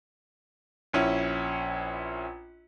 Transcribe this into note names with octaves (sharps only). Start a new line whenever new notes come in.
A#1 C#4 E4